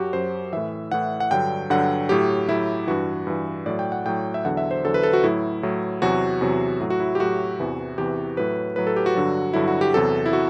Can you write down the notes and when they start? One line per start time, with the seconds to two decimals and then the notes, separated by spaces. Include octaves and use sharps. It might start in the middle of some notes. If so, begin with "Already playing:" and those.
Already playing: F#2 F#3 F#4 G4
0.13 F#2 F#3 C5
0.53 A2 E3 E5
0.91 A2 E3 F#5
1.20 F#5
1.31 G2 D3 F#3 G5
1.70 G2 D3 F#3 F#5
2.09 A2 F#3 G4
2.48 A2 F#3 E4
2.87 G2 E3 F#4
3.27 G2 E3
3.66 A2 F#3 D5
3.79 G5
3.92 F#5
4.06 A2 F#3 G5
4.34 E5
4.45 E2 D3 F#3 F#5
4.57 E5
4.71 C5
4.84 E2 D3 F#3 A4
4.94 B4
5.03 A4
5.13 F#4
5.23 A2 F#3 E4
5.63 A2 F#3
6.02 E2 C3 F#3 F#4
6.41 E2 C3 F#3
6.80 A2 F#3
6.90 F#4
7.00 E4
7.15 G4
7.20 A2 F#3 F#4
7.59 E2 C3 E3
7.98 E2 C3 E3 G4
8.37 A2 F#3 B4
8.76 A2 F#3 B4
8.87 A4
8.96 G4
9.06 F#4
9.15 G2 D3 F#3
9.54 G2 D3 F#3 E4
9.68 F#4
9.81 G4
9.94 E2 C3 F#3 A4
10.26 E4
10.33 F#4